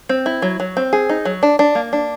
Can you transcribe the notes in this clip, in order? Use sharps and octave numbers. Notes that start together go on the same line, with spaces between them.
C4
E4
F#3
F#3
C4
G#4
D#4
F#3
D4
D4
A#3
D4